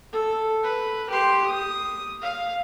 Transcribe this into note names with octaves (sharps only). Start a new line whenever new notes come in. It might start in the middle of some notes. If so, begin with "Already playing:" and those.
A4
B4
G4 C6
D#6
F5